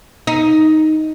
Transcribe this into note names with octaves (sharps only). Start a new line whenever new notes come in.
D#4